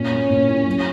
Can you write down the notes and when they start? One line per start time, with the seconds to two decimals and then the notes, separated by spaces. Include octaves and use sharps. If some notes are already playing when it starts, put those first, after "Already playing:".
Already playing: A#2 C#4
0.12 A#3
0.30 A#2
0.48 E4
0.67 F#3